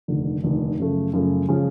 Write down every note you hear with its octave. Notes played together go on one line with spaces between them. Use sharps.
F1 D#2 D3
F1 D#2 D3
F#2 C#3 F3 A3
F#2 C#3 F3 A3
C#3 F3 G#3 C#4